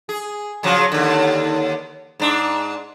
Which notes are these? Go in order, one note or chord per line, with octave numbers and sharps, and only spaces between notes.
G#4
C#3 F3 F#3
D#2 D3
G#2 D4